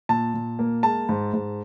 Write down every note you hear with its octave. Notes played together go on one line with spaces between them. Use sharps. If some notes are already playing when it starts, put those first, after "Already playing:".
A#2 A5
A#2
A#3
G#3 A5
G#2
G#2